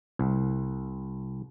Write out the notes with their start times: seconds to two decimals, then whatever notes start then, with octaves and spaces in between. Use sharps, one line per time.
0.19 C2